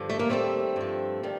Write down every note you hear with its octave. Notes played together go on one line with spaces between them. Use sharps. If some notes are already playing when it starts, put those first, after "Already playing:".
Already playing: G2 D3 F3
A3
A#3
D#2 D#3 G3 A3 C4
G2 F3
D#3 G3